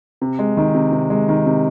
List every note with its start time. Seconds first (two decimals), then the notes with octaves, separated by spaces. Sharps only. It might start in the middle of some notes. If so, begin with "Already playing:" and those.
0.21 C3
0.39 G#3
0.57 D#3
0.75 C3
0.92 C3
1.10 G#3
1.29 D#3
1.46 C3